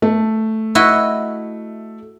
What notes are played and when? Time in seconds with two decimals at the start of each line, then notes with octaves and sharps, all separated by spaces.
0.02 A3
0.75 E4 F#4 D#5